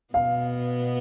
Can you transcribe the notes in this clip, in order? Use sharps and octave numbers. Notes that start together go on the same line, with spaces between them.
B2 B3 F5